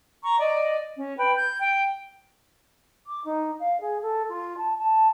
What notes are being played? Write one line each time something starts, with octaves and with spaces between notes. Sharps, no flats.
A#5 C#6
D5 D#5
C#4
B4 G5
G6
G5
D6
D#4
F5
G#4
A4
F4
A5
A5